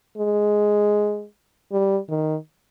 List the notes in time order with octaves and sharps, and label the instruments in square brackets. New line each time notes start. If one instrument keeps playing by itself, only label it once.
[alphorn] G#3
G3
D#3